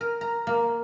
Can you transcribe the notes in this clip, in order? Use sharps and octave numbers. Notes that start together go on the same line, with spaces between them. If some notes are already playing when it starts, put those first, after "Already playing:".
A#4
A#5
A#3